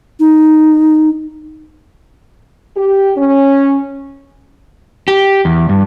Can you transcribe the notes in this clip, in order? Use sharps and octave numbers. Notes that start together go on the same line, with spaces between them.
D#4
G4
C#4
G4
E2
G2